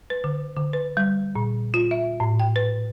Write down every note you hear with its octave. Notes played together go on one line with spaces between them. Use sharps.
B4
D3
D3
B4
G3
A#2
F4
E5
A2
G5
B4